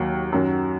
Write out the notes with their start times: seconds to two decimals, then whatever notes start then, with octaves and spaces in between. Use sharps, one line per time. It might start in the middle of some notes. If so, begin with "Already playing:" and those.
Already playing: D#2 D#3 F#3
0.32 F#2 D#3 F#3